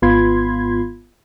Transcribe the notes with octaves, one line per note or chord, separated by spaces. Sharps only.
G#1 B3 F4 B5 C6 G#6